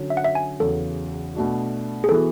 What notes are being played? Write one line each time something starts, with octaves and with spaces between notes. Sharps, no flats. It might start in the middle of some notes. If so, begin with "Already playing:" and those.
Already playing: D3 F#3 C#4
E5
F#5
E5
G#5
E2 C#3 F#3 A4
B2 A3 D4 F#4
G#4
E3 B3 F#4 A4